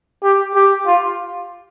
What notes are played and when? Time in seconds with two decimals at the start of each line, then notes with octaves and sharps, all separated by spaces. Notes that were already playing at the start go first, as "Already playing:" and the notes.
0.23 G4
0.55 G4
0.86 F4